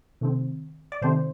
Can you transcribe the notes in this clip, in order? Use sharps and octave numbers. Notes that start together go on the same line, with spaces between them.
C3 D#3 A3 C4
D5
C3 D#3 A3 C4 C5